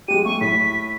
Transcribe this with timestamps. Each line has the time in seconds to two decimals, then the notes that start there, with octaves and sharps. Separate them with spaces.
0.08 F#3 G#3 G4 D#7
0.25 A3 C#6
0.41 A2 B6